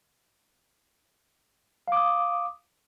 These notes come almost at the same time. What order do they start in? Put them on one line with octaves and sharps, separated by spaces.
F5 D6 D#6